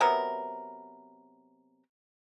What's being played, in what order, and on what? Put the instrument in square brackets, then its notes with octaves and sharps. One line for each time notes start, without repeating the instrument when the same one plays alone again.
[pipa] C3 F#3 B3 A#4